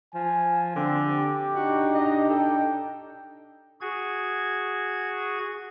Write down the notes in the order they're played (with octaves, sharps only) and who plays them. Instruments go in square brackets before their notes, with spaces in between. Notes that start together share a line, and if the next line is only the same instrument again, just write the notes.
[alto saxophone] F3 [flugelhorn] G#5
[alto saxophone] D3 [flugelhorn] C4
[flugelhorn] G4
[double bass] D4 D#4 [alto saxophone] F#4
[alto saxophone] D#5
[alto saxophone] A4 [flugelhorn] G5
[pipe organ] F#4 G#4 G#6